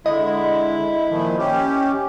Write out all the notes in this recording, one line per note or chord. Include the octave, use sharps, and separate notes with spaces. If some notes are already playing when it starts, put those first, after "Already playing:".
D3 G#3 E4 D#5
A#2 D#3 F3
C#4 G4